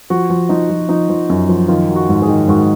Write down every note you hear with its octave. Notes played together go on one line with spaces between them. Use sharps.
F3 F#4
F3
F3 D#4
F3
F3 D#4
F3
F#2
F3
D#3 F4
F#3
F#4
G#2
G#4
D#3
G#2 F#4